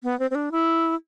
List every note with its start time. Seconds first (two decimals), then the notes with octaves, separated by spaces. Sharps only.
0.03 B3
0.19 C4
0.31 C4
0.35 D4
0.52 E4